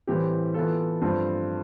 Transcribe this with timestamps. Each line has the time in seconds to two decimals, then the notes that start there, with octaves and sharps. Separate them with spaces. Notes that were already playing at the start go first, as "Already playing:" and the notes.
0.07 A2 E3 G3 C4 G4
0.54 E3 B3 F4 A4
1.01 G2 F3 A3 C4